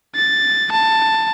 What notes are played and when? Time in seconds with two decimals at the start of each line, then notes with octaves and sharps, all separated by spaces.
0.15 A6
0.72 A5